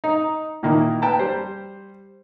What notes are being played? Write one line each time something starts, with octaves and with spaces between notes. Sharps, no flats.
D#4
A#2 D#3 A#3 D#4 E4
B4 G5 A5 A#5
G3 C5